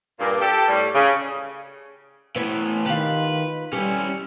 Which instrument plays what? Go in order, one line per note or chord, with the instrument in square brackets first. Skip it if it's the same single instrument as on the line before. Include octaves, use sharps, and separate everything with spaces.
[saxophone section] G2 A#2
G4 A4
A2 G3
C#3
[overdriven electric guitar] A2 E3 [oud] B3 C#5
[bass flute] D#3 [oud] F4 G4 [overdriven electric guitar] B4
[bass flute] G3 [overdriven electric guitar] C#4 E4 [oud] G4